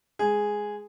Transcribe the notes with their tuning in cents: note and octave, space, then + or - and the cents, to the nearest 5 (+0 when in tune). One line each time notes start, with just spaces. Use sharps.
G#3 +0 G#4 +0